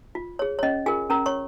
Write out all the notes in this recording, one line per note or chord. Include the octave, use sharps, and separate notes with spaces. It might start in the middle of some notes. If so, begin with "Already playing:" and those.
F4
G#4 C#5
C#5
C#4 D#5
F4 G#4 A#4 G#5
C#4 A#4 A#5
C#5 C#6